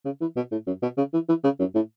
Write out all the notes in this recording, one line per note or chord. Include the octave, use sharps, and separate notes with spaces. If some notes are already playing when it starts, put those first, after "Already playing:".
C#3
E3
B2
A2
F#2
B2
C#3
E3
E3
C#3
F#2
A2